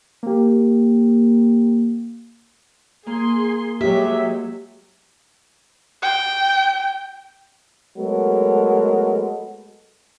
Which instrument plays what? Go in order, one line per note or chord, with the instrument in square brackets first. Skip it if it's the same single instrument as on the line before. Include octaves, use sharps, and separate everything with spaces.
[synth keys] A#3 G4
[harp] A#3 [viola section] G#4 C6
[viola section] F#3 G#3 [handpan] G4 [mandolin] E5
[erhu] G5
[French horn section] F#3 G#3 A3 B3 A4 A#4